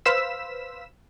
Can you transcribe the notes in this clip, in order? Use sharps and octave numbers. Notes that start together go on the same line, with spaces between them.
B4 C5 F5 E6 B6 E7